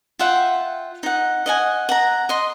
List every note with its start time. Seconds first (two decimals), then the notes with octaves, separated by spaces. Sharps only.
0.19 F4 E5 F#5 G5
1.03 D#4 F#5
1.46 D#5 F#5 G#5
1.89 F#5 A#5
2.29 D#5 C6